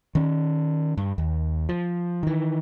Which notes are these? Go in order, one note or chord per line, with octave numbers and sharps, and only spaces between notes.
D#3 C#4
G2
D#2
F3
D#3 E3